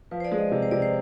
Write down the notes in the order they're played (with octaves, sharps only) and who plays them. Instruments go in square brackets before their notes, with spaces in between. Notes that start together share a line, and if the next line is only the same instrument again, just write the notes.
[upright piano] F3 [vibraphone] B4
[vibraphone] C5
D5
[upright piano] G#3
[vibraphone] D#5
[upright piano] C3
[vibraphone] C5
[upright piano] C3 [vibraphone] D5
[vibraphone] C5